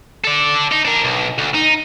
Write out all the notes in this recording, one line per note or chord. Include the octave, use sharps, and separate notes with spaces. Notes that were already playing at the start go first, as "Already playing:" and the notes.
A4 D5
D#4
D4 A#4
B1
D2
D#4